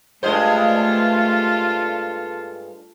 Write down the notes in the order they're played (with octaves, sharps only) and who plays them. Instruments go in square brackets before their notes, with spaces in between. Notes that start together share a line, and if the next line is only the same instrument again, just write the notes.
[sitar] G2 G#3 C5 [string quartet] A3 [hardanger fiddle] F4 A4